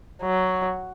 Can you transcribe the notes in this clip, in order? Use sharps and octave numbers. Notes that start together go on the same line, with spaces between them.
F#3